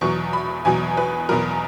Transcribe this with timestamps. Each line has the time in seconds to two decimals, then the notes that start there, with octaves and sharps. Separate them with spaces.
0.01 E2 B2 F#3 C#6
0.33 B5
0.65 E2 B2 F#3 G#5
0.97 B4
1.29 E2 B2 F#3 A#4